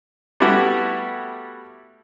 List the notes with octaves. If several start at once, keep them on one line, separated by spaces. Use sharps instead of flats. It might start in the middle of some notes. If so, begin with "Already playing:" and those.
G3 A3 B3 E4 F#4 G4